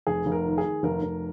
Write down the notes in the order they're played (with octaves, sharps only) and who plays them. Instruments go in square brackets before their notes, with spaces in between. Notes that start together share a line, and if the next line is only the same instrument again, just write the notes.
[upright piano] F1 G#4
F1
A#4
D#3
G#4
D#3
F1 A#4
F1